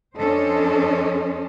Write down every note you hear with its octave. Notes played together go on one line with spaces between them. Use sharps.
F2 C#4 D4 A4 C5 D#5